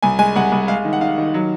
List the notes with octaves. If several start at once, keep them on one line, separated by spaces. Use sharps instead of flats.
C2 G#5
G#3 G#5
C2 F#5
C2
G#3 F5
D#3
F#5
D#3 F5
D#3
F#3